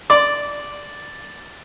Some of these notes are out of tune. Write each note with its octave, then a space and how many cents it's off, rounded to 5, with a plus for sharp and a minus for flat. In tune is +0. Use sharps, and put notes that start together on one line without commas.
D5 -5